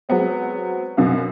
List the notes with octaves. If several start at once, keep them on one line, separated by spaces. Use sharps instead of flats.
F#3 G#3 B3 C4
F#2 B2 F#4 F5